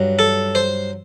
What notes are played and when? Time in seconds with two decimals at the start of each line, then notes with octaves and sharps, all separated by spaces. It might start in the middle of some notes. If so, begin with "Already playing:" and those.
Already playing: G2 F#3
0.19 A4
0.55 C5